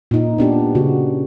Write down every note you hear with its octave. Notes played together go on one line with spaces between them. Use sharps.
A#2 D#4
B3 D4 G4
C#3 F#4